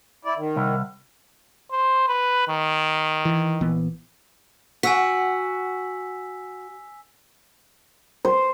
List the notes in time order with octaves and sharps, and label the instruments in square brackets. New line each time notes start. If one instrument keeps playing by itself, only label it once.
[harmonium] E4 D5
D#3
[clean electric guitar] C2
[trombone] C5
B4
D#3
[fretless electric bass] E3
A#1 E3 B3
[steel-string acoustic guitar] F#4 [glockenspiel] G#5 E6 B6
[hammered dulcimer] C5